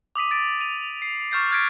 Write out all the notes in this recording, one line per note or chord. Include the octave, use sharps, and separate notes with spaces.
D6 D#6 B6 D#7
A6 D7
D#7 F7
C7
C#6 F6 G6 A6 C7
F6 F#6 G#6 A6 B6 D7